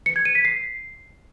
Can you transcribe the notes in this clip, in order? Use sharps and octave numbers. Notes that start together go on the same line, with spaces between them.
C#7
G#6
D#7
B6
C7